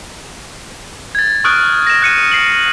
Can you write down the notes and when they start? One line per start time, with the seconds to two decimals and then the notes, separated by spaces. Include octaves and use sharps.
1.15 G#6 A6
1.44 C#6 D#6 F6 F#6 D7
1.87 A#6 E7
2.02 F#6 C#7 D#7
2.32 C7 D7 F#7